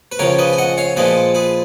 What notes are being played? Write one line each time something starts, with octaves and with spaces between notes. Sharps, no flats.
B4
C#2 C#3 F3 A#4 C#5
B4 D#5
G#5
D#5 F#5
C#5 F5
A#2 F3 G#3 B4 D#5
G#4 B4